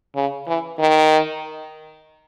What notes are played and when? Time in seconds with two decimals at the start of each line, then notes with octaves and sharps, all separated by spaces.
0.16 C#3
0.48 E3
0.80 D#3